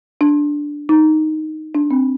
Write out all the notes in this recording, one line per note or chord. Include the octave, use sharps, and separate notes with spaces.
D4
D#4
D4
C4